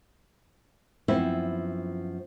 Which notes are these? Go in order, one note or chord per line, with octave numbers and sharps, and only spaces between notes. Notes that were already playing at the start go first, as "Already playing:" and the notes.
F#2 F3 B3 C4 E4